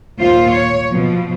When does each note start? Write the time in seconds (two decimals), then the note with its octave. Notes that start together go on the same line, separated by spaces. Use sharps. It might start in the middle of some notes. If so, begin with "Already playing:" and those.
0.19 D#2 A#2 F4 C5
0.51 C#5
0.90 B2 F3